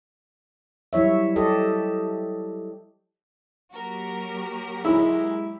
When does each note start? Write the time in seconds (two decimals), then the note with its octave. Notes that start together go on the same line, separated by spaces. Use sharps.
0.93 F#3 G3 E4 C#5 E5
1.36 G4 A4 D#5
3.73 F#3 A#3 F#4 G4 A#4
4.85 G#3 E4